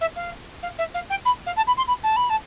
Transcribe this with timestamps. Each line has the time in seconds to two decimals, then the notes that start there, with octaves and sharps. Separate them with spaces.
0.01 E5
0.16 F5
0.63 F5
0.78 E5
0.94 F5
1.10 G5
1.25 B5
1.46 F5
1.57 A5
1.67 B5
1.77 C6
1.87 B5
2.03 A5
2.16 B5
2.30 A5